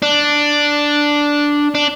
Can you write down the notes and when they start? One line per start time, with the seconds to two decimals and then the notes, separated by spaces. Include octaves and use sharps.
0.02 D4
1.75 D4